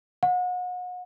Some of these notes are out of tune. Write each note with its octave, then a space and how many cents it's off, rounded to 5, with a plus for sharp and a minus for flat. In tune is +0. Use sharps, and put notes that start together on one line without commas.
F#5 -35